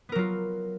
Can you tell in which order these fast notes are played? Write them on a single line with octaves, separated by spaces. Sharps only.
B3 A#4 F#3 F4